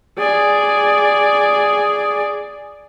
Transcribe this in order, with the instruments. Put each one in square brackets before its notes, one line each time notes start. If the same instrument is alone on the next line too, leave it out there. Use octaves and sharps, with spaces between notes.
[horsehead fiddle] G#4 D5